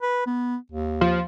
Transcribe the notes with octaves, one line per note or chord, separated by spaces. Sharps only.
B4
B3
D#2
F3